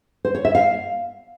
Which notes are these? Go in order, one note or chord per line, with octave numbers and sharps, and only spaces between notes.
C5
C#5
E5
F5